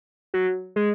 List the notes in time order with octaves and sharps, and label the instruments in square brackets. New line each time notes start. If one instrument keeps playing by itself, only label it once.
[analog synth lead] F#3
G#3